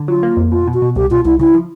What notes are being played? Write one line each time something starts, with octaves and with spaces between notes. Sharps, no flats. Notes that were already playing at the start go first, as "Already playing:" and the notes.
Already playing: D3
F#3 F4
A#3
F2
B2 F4
B2
F#4
B2
C2 G4
B2 F4
C2 E4
C#3 E4
F3